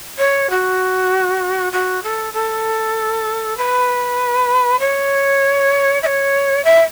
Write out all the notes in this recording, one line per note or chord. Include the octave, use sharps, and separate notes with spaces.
C#5
F#4
F#4
A4
A4
B4
C#5
E5
C#5
E5